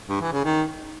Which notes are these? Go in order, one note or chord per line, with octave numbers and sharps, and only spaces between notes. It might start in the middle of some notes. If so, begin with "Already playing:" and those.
G2
E3
C#3
D#3